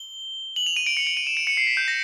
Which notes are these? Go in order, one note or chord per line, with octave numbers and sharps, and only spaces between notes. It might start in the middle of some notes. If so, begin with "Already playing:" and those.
Already playing: G7
F#7
F7
D#7
D7
C#7
D7
D#7
E7
D7
C#7
C7
B6
G6
A#6